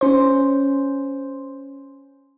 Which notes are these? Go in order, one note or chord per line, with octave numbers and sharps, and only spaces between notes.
C#4 C5